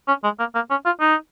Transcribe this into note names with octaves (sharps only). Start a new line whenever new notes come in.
C#4
G#3
A#3
A#3
C#4
F4
D#4